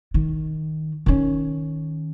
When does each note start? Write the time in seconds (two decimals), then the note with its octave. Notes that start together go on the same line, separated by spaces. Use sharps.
0.14 D#3
1.06 D#3 C#4